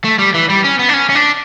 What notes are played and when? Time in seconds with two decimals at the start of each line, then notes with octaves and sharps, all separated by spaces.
0.04 A3
0.19 G3
0.34 E3
0.50 G3
0.64 C#4
0.79 B3
0.89 D4
0.94 C#4
1.10 C#4
1.15 D4